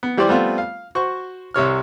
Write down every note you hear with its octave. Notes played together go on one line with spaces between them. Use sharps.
B3
E3 G3 G4 C5 D5
G3 A3 B3 C4 F4
F5
F#4 C5 C#6
C2 C3 C#5 F6